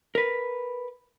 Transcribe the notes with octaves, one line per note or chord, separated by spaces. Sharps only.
A#4 B4